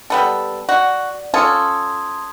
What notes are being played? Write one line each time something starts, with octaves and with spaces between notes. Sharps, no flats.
G3 B3 A4
F#4 D5
C#4 F4 A4 C6 D#6 G#6